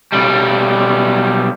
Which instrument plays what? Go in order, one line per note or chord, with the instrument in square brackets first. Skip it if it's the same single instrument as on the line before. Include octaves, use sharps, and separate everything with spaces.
[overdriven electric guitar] B1 G3